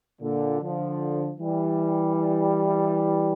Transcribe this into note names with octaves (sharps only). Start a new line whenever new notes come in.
A#2 D3
D3 F3
E3 G3